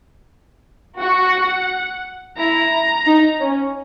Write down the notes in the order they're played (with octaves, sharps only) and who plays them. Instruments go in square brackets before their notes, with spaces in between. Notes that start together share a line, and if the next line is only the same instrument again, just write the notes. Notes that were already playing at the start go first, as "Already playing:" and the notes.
[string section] F#4 [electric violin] F#5
[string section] E4 [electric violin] A#5
[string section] D#4
C#4